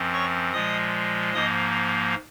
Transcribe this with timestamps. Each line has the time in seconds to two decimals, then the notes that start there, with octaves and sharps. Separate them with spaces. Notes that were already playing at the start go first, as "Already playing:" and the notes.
Already playing: F#2 F3 C4
0.13 C#5 C#6
0.53 A#2 F3 G#3 D#5 D#6
1.34 G#2 F3 A#3 D#5 D#6